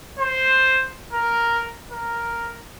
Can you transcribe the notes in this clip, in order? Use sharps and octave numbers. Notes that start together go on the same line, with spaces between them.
C5
A#4
A#4